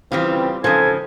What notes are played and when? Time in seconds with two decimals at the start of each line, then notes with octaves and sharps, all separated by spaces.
0.12 C#3 E3 G3 C4 F4
0.64 G#2 C#3 F3 A4 G#5